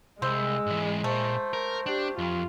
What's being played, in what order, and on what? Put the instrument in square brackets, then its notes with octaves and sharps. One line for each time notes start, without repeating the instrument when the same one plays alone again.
[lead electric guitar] C2 [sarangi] G#3 [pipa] C5 [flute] E6
[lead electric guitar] G#2 E3
[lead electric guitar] A#2 [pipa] A3 [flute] C5
[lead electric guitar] A#4
[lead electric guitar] D4 [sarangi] G4
[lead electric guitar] F2 [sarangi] F4